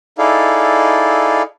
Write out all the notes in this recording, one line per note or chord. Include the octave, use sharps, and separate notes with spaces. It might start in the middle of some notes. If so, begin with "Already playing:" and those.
D#4 E4 G#4 A4 D5 F5